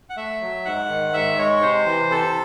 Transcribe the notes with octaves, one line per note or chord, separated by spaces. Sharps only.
F#5
A3 E5
F#3
G#2 F#5
D#3
G#2 E5
G#3 C#5
C3 C5
E3
C3 A4